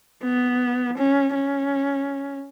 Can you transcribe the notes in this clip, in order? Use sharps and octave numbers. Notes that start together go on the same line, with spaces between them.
B3
C#4
C#4